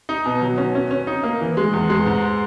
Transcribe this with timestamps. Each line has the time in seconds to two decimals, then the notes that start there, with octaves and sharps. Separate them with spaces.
0.09 D#4
0.26 B2
0.42 F#3
0.58 C#4
0.75 C#4
0.91 C#4
1.07 D#4
1.24 A#3
1.41 E3
1.57 G#3
1.73 E2
1.90 G#3
2.06 G#2